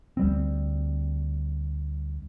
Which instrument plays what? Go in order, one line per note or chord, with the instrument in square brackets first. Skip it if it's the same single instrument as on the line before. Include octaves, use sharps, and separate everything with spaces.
[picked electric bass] D2 G3 C4